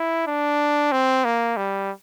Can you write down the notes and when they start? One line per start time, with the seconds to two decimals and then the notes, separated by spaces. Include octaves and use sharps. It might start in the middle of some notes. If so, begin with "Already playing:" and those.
Already playing: E4
0.27 D4
0.92 C4
1.24 A#3
1.57 G3